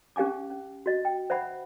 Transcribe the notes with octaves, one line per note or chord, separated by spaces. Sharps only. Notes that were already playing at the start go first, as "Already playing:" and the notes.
C#4 G4 F5 G#5 D6
C#4
F#4 D#5
G5
C5 E5 F#5 B5